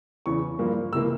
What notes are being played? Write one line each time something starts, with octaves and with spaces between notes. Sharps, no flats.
E2 C#3 E3 C#6
G2 F3 A#3
C#2 C3 E3 A#3 E6